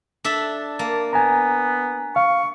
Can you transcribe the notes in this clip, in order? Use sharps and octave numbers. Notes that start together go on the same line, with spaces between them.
D4 A4 E5
A#3 A5
B3 G#5 A#5
F5 C#6